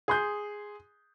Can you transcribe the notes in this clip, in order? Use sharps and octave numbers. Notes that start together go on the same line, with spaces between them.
G#4 C6 G6